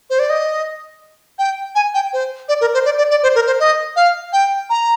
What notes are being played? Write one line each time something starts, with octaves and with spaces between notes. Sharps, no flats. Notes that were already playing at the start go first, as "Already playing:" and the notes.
C5
D5
D#5
G5
G#5
G5
C5
D5
A#4
C5
D5
D5
D5
C5
A#4
C5
D#5
F5
G5
A#5